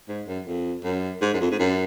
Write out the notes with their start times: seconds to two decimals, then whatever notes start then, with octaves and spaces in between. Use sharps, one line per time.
0.08 G#2
0.28 F#2
0.46 F2
0.84 F#2
1.21 G#2
1.34 F#2
1.40 F2
1.51 G#2
1.59 F#2